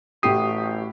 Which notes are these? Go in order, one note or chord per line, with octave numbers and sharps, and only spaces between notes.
A1 A2 F#4 G4 D#6 C7